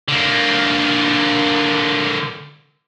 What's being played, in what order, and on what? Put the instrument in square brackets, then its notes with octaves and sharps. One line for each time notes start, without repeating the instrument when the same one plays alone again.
[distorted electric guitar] D3 A#3